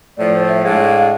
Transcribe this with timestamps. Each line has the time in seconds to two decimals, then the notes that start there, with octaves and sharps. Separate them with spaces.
0.17 A2 F3 A3 D5
0.32 C5
0.48 E5
0.63 A2 G#3 D4 F5
0.87 F5